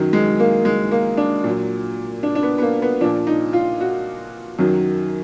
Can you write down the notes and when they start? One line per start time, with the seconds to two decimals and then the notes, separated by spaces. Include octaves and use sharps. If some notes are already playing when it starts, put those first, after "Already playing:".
Already playing: F#2 D#3 F#3
0.13 G#3
0.40 A#3
0.65 G#3
0.91 A#3
1.17 D4
1.44 A#2 F#3
2.23 D4
2.35 D4
2.43 B3
2.58 B3
2.62 A#3
2.82 B3
3.01 A#2 F3 D4
3.27 D#4
3.53 F4
3.80 F#4
4.59 F#2 D#3 F#3